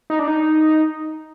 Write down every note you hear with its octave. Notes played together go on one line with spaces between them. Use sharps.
D#4
D4
D#4